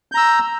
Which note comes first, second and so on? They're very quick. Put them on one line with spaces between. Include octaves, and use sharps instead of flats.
G6 A#5 E6